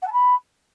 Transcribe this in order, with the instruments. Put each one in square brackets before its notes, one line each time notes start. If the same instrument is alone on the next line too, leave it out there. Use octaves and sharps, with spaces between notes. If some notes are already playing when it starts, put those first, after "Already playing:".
[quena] F#5
A5
B5